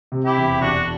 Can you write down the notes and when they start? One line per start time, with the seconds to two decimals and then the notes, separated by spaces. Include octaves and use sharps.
0.12 C3
0.24 E4 G4
0.37 E1
0.61 E1 D4 F#4